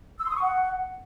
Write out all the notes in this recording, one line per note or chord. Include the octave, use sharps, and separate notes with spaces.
E6
C6
D#6
C#6
F#5